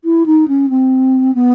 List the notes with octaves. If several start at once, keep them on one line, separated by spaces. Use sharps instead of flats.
E4
D#4
C#4
C4
B3